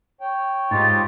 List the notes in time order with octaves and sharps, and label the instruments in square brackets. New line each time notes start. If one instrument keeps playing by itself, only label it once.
[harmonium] C#5 G5
[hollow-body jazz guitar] G#2 [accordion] D#4 F4 G4 [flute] A6